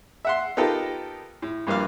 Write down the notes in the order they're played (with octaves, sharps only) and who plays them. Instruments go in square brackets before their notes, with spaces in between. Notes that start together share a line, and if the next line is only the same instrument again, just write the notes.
[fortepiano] E5 F#5 C6
B3 D#4 F4 G4 A4 A#4
A2
A#1 G2 A#3 F5